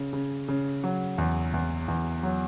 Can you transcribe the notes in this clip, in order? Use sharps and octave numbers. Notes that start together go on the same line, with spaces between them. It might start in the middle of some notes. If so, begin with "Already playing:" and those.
Already playing: C#3
C#3
C#3
F#3
E2
E2
E2
F#3